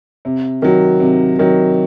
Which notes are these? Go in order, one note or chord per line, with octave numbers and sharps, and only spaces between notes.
C3
D#3 F#3
C3
D#3 F#3